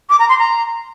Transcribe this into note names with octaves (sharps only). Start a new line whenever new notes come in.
D6
A#5
C6
A#5